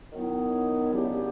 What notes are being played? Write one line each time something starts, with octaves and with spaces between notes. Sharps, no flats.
D#3 F#3 B3 E4
C#3 F#3 B3 D4 G4